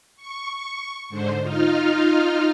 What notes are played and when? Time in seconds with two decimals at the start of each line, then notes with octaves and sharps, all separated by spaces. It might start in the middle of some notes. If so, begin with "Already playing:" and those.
0.16 C#6
1.09 G#2 D3 C5
1.42 D#4 F4 F5